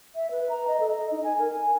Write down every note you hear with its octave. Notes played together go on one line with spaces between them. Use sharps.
E5
B4
A#5
D#5
A4
D#5
D#4
G#5
A#4
G#5